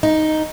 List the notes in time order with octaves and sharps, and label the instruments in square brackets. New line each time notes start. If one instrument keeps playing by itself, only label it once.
[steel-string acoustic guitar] D#4